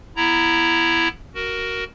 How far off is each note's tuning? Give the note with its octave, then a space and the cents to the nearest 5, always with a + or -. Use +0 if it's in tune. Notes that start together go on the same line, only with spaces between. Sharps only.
B3 -5 E4 +10 A#5 +0
F#4 +15 A#4 +5